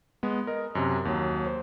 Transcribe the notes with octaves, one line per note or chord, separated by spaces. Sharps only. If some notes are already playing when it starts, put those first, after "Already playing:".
G#3 B3
A#4 D#5
F#2 C3
D#2 F#3
C5